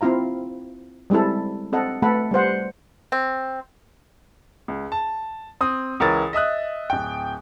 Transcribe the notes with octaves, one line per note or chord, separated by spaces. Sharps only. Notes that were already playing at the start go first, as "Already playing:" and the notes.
C4 E4 F4 F5 A#5
G3 G#3 C4 E4 A4
C4 A4 D#5 F#5
A3 B3 A4 F#5 B5
G3 B3 C5 F#5
C4
C#2
A5
C4 D#6
C#2 E3 A#4 C#5 A6
D#5 E5 D#6 F#6
D1 G5